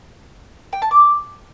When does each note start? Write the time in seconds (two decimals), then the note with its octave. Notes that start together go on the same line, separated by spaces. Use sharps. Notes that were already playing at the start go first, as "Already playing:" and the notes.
0.73 G5
0.82 A5
0.91 D6